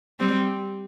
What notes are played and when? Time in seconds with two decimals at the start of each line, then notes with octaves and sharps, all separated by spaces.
0.20 G3 C4